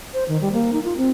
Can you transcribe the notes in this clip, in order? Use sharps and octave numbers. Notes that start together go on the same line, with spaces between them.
C5
D#3
G3
A#3
D#4
F4
C4